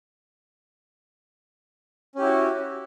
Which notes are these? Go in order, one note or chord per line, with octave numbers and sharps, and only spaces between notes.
C#4 E4 F#4 G4